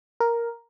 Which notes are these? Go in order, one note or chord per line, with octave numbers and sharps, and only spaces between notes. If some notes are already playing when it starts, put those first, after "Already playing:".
A#4